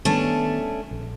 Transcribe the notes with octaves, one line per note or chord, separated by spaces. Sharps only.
D#3 G3 A3 B3 C#4 D4
A#1